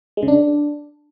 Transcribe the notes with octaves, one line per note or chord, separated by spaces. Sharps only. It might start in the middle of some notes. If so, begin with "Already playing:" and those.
G#3
C#3
D4